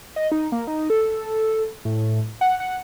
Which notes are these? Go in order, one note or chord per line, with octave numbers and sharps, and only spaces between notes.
D#5
D#4
A#3
D#4
A4
A2
F#5
F#5